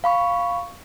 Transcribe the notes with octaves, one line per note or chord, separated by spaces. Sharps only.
F5 B5 C#6